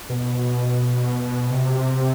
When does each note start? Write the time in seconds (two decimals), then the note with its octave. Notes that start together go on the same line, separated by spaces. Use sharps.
0.10 B2
1.50 C3